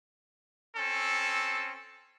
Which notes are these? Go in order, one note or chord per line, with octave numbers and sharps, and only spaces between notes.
C4 C#4 A4